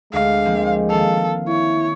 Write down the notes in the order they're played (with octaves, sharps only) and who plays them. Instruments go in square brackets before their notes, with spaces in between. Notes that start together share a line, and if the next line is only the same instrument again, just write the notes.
[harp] D2 [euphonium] G#3 [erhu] F5
[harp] F3 A#3 C4
[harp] D#3 F5 [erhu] A4
[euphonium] E4 [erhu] C#5